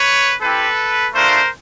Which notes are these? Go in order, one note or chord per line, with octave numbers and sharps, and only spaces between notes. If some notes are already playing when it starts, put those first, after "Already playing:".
Already playing: B4 C#5
C4 E4 G4 A4 B4
A3 D4 F4 A#4 C5